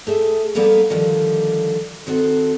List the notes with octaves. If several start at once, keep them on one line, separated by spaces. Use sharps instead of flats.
A3 G#4 E5
G3 A#3 B3 E4 A4 F5
D3 D#3 F3 G3
D#3 C4 F#4 A4